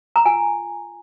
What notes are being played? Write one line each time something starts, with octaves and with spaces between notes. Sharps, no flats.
A#5
F4 G#5